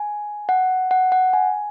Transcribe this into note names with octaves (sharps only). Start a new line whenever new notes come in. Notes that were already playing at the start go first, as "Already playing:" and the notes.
Already playing: G#5
F#5
F#5
F#5
G#5